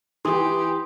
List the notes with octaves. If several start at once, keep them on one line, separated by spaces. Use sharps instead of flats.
E3 G4 C6 D#6